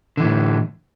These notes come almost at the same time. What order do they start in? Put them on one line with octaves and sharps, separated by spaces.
D3 E3 A2